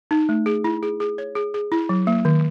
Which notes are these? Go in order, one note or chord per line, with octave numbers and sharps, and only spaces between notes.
D#4
A3
G#4
E4
G#4
G#4
C#5
G#4
G#4
E4
F#3
A#3
D#3